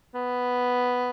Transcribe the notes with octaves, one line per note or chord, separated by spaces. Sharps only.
B3